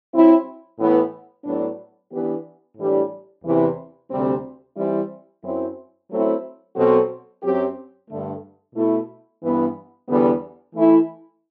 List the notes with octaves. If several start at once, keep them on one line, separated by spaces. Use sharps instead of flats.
F#3 C4 E4
A2 E3 B3
A2 F#3 B3 D4
E3 B3 D4 G4 B4
A2 E3 G3 D4
E2 C3 E3
D2 C3 G3 C4
E3 G3 C4 E4
F#2 F#3 C4 E4
F#3 A3 C4 E4
B2 F#3 C4 F#4 A4
F#2 F#3 C4 G4
G2 D3 A3
B2 A3 E4
G2 E3 B3
E2 D3 G3 B3
E3 A3 E4